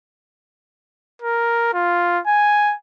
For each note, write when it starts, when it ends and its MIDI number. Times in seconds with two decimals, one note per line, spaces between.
1.22 1.70 70
1.73 2.20 65
2.27 2.74 80